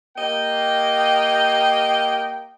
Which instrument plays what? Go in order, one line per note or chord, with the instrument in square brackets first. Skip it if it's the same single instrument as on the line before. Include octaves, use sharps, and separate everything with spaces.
[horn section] A#3 G4 D#5 G5